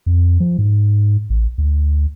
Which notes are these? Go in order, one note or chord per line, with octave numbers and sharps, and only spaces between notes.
F2
F3
G#2
A1
D2